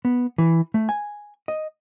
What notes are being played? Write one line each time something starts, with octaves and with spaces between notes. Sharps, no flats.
B3
E3
A3
G#5
D#5